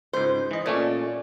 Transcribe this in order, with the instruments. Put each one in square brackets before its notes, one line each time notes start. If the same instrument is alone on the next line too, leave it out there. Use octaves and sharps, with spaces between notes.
[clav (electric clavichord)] C#2 G#2 [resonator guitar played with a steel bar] C5
[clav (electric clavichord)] E3 D#5
[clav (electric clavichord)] A#2 A3 C#4 [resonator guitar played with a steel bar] D5